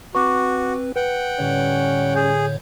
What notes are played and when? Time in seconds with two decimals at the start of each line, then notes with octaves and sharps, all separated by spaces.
0.15 C4 F#4 B4 C#6 D6
0.96 B4 F#5 G5
1.39 A2 D3 G3 C#4 C#5
2.16 G#4 G6